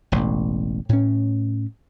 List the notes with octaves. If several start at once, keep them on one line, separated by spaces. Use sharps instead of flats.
E1 A1
A2 C#4